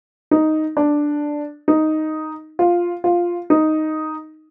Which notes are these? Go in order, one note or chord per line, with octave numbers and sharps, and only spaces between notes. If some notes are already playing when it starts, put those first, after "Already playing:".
D#4
D4
D#4
F4
F4
D#4